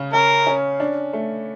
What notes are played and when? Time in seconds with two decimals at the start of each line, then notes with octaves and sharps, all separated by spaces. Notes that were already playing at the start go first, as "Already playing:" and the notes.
Already playing: C#3
0.13 C#4 A#4
0.47 C#4
0.80 D4
1.13 A3